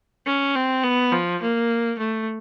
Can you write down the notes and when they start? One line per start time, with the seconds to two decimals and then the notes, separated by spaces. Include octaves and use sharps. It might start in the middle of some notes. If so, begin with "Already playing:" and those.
0.26 C#4
0.55 C4
0.83 B3
1.12 F3
1.42 A#3
1.99 A3